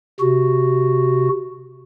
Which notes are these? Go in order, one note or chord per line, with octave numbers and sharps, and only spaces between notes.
C3 F#4